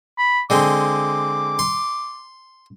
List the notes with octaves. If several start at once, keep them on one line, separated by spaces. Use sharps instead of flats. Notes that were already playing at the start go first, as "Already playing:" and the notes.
B5
D3 G#3 C4 D6
C6